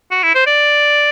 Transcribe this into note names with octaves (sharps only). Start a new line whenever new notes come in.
F#4
E4
C5
D5